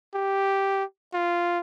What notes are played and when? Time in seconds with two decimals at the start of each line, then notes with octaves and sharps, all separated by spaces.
0.14 G4
1.14 F4